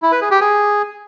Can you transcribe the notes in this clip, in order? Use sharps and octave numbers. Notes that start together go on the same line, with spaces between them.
E4
B4
G#4
G4
G#4